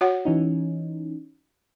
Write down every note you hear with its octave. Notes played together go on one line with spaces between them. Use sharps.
F#4 C#5 F#5
E3 C#4 D#4